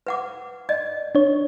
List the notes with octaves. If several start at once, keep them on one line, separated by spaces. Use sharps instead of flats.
B4 F#5 D6
D5 D#5
D4 C#5